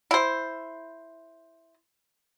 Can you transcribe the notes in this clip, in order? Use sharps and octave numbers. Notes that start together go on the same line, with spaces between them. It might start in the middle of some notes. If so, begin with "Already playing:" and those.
E4 C5